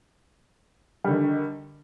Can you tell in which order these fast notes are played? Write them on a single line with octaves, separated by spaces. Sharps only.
G3 D3 D#3